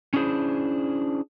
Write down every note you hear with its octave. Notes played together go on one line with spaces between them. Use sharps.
C#4 D4 E4 G#4 C5